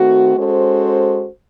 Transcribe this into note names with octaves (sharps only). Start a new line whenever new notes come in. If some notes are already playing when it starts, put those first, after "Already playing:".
Already playing: D#3 A3 C4 F#4
G#3 C#4 F#4 A4 C5